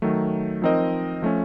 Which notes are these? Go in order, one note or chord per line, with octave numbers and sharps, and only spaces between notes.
D#3 F#3 A3
F3 C4 D#4 A#4 D#5
F3 A3 C#4